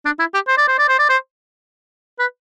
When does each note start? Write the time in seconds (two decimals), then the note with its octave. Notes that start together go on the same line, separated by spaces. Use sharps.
0.05 D4
0.19 E4
0.34 G4
0.48 C5
0.58 D5
0.68 C5
0.79 D5
0.89 C5
0.99 D5
1.09 C5
2.19 B4